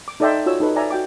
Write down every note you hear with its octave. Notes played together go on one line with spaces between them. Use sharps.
D6
D#4 A4 D5 E5 G5 C6
F4 F#4 C#5 E6
D#4 A4 B4
D5 E5 G#5 A#5
F#4 G5 D6